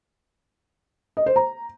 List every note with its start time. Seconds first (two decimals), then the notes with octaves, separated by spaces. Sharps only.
1.17 D#5
1.26 C5
1.36 A#5